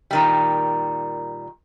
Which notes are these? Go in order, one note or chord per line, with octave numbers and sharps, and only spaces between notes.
A#2 D#3 G3